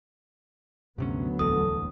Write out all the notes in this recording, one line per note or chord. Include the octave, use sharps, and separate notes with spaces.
D2 G2 C3 F#3 B3 C#4
D1 A#1 E2 A4 D#6